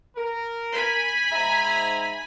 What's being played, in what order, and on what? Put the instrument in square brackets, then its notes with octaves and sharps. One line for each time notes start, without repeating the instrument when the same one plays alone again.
[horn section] A#4
[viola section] G#5 B5
[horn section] G#2 E5 A#5